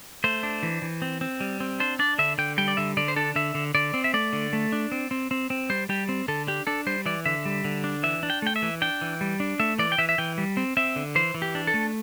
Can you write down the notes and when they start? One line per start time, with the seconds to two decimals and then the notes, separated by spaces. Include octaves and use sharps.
0.24 A3 C5
0.43 D4
0.63 E3
0.82 E3
1.02 C4
1.21 C4
1.40 G3
1.60 C4
1.80 D4 C5
1.99 D4 D5
2.19 D3 E5
2.38 D3 G5
2.58 G3 G5
2.68 D5
2.77 D3 E5
2.97 D3 D5
3.08 C5
3.16 D4 A4
3.36 D3 E5
3.55 D3
3.75 D3 D5
3.94 C4
4.04 E5
4.14 A3 D5
4.33 D3
4.53 A3
4.72 D4
4.92 C4
5.11 C4
5.31 C4
5.50 C4
5.70 G3 C5
5.89 G3 G4
6.09 C4
6.28 D3 A4
6.47 D4 G4
6.67 D4 A4
6.87 G3 C5
7.06 E3 D5
7.26 D3 E5
7.45 G3
7.64 D3
7.84 D4
8.03 E3 E5
8.23 D4
8.30 G5
8.42 A3 G5
8.56 E5
8.62 E3
8.82 D4 G5
9.02 E3
9.21 G3
9.40 D4
9.60 A3 E5
9.79 E3 D5
9.92 G5
9.98 E3 E5
10.09 E5
10.18 E3 G5
10.38 G3
10.57 C4
10.77 C4 E5
10.96 D3
11.15 E3 C5
11.34 E3
11.42 G4
11.55 D4
11.67 A4
11.74 A3